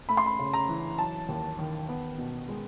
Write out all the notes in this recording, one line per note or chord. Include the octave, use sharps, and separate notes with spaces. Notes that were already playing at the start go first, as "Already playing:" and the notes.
A3 B5
C6
B5
C#3
A#5
E3
F#3 A5
D#2
D#3
B3
B2
G#3